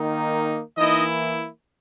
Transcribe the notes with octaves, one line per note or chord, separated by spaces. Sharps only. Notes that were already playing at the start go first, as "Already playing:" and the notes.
Already playing: D#3 A#3 D#4
E3 A#3 D#4 E4 D#5